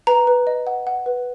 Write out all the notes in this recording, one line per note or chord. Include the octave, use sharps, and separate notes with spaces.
B4 A#5
B4
D#5
F#5
F#5
B4